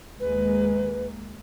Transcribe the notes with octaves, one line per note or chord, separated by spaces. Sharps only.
D#2 G#3 A#3 B4